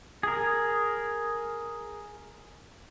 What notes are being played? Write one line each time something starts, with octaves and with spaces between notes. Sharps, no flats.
G#4 A#4